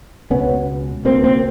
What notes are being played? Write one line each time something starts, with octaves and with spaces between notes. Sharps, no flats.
C#2 B2 B3 C#4
C#2 B2 A#3 C4
A#3 C4